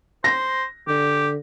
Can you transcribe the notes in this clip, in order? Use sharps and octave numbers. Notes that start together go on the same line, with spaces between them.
C5 A#6
D3 G4